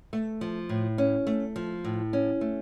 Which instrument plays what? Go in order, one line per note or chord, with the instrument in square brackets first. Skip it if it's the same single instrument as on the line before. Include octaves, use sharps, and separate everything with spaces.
[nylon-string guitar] A3
F3
A2
C#4
A3
F3
A2
C#4
A3